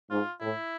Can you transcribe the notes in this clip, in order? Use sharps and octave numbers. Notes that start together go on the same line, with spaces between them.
G#2 F4
A2 E4